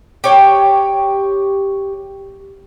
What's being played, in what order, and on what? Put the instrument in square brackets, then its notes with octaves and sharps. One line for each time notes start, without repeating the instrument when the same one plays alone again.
[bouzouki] G4 C#5 G5